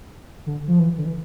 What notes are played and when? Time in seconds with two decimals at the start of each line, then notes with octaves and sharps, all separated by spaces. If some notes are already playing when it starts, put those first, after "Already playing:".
0.46 D3
0.68 F3
0.79 E3
0.98 D3
1.05 E3